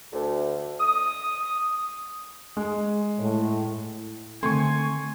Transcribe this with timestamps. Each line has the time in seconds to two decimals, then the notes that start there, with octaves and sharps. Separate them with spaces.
0.13 D2
0.80 D#6
2.57 G#3
3.19 A2
4.43 D3 D#3 A3 C4 G#5 C6 C#6